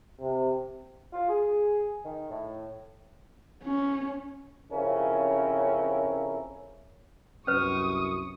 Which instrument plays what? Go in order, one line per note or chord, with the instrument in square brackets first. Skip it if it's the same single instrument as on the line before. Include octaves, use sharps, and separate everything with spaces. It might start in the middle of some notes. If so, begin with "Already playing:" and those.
[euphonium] C3
[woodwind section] F4
G#4
D#3
A2
[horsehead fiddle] C#4
[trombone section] F2 C#3 C#4 E4 A#4
[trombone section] C2 F#2 [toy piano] C#4 B4 [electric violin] C#6 D#6